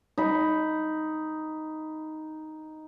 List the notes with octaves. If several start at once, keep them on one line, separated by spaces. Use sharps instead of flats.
D#4 B5